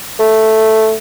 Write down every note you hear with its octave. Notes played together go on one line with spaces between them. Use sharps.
A3